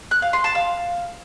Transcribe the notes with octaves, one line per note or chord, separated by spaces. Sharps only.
F#6
F5
C6
A5
F5